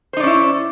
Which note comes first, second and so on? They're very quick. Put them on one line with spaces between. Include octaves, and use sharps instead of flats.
C5 D#4 D5 C#4 E4